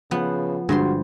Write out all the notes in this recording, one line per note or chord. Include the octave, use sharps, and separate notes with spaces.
C#3 F3 B3 F#5
G2 D3 G#3 F#4 C5 C6